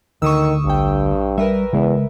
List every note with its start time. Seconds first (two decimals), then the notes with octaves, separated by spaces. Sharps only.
0.22 D2 D3 D#3 C#6 D#6 E6
0.65 A#1 G2 G5
1.38 G3 A#4 B4 E5
1.73 E2 C#3 G#3